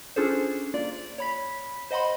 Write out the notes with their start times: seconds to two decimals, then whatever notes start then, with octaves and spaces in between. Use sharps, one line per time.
0.16 C#4 D4 F4 G#4 A4 C5
0.74 A#3 F4 D5
1.18 C#5 B5 B6
1.91 C5 D#5 F#5 B5 C6